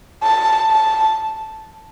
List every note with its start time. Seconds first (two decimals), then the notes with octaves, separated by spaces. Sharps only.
0.23 A5
0.71 A5